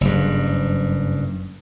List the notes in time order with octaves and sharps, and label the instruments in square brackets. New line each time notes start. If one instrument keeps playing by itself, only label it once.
[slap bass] F#1 G2